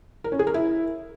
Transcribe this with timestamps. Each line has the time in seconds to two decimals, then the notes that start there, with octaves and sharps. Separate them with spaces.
0.24 A#4
0.32 C#4
0.39 G#4
0.47 A#4
0.54 E4